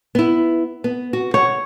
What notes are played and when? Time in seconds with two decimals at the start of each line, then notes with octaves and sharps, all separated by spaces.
0.15 B3 E4
0.84 B3
1.13 F#4
1.34 C#5 F#5